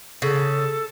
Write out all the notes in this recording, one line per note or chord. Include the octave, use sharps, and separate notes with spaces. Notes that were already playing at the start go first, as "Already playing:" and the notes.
C#3 A4